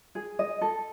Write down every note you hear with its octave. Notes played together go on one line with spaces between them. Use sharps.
G#4
D#5
A4